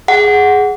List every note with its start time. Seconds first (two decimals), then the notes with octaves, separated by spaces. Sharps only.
0.08 G#4 F#5
0.24 G#4